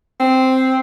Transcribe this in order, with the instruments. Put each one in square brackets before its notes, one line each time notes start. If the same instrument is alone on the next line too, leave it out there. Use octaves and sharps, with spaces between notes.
[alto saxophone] C4